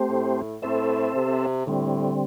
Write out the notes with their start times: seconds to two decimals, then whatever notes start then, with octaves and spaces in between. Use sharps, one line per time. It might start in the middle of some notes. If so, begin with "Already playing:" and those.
Already playing: A3 C4 G4 C5
0.10 A2
0.62 A2 C4 A4 C5 E5
1.15 C3
1.66 A2 D3 G3 C4